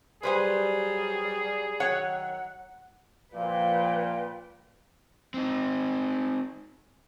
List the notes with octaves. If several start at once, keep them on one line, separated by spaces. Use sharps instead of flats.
F#3 G3 G#4 B4 C5 G#5
D#3 F#3 C#5 F#5
A#2 F3 B4 F5 G5
C4 D#4